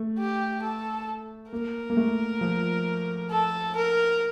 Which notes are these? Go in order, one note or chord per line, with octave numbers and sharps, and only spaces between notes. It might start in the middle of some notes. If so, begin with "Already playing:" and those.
Already playing: A3
G4
A4
A#3 A#4
A#3
A3
F3
A4
A#4